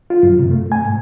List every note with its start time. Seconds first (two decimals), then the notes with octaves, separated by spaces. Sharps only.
0.10 F4
0.23 F#2
0.39 C3
0.51 A3
0.72 G#5
0.84 G#2